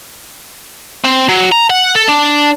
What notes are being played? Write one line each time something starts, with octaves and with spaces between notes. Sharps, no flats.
C4
F#3
A#5
F#5
A4
D4